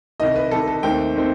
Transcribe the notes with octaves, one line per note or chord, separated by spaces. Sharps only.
C2 C3 D#3 D#5
B4
C2 C3 D#3 A4
A4
D#2 D#3 A3 C4 G5
D#3 A3 C4